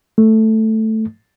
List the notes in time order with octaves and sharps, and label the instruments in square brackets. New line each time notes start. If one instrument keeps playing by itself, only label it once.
[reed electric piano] A3